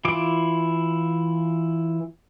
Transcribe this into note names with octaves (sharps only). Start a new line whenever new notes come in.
E3 E4 F4 D6